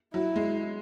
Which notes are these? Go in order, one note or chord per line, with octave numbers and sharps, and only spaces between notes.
F#3 E4
G#3